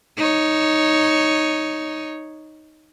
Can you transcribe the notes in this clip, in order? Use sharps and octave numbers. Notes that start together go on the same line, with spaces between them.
D#4 C#5